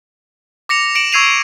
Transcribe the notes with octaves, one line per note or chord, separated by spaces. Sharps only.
D6 A#6 C#7 F7
C#7 D7 E7 F#7
C#6 E6 G#6 C7 D#7 F7